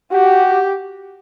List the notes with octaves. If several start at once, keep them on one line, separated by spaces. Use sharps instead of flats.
F#4 G4